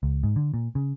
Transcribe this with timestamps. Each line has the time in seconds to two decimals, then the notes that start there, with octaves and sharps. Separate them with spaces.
0.03 C#2
0.23 G#2
0.36 D3
0.54 A#2
0.75 C#3